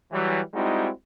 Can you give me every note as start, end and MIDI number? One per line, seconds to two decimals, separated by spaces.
0.12 0.40 52
0.12 0.40 54
0.12 0.40 55
0.54 0.89 55
0.54 0.89 56
0.54 0.89 60
0.54 0.89 63
0.54 0.89 64
0.54 0.89 66